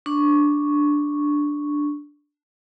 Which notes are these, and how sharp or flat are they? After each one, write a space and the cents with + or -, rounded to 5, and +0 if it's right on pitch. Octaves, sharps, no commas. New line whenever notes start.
D4 +0 C#6 +0